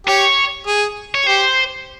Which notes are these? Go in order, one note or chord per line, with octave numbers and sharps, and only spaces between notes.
G4 C#5
G#4
C#5
G4 C5